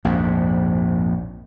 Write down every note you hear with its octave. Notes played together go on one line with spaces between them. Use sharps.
A#1 F2 G#2